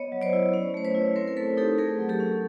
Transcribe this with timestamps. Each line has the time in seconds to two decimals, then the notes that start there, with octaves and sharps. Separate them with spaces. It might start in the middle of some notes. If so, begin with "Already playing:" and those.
Already playing: B3 C#5 D#5
0.12 F#3
0.22 C5 D5
0.33 E4
0.53 C#4
0.74 A3 C5
0.84 B4 C#5
0.95 E4
1.16 C4 A#4 C5
1.28 A#4
1.37 A3 A4 B4
1.57 D#4 G4 A4
1.78 A3 G#4 A#4
1.99 F#3
2.09 G4 A4
2.20 C#4